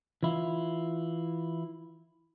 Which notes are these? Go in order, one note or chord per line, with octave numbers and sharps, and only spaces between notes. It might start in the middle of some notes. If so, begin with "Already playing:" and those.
E3 E4 F4